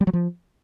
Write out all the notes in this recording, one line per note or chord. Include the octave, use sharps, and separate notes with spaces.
G3
F#3
F3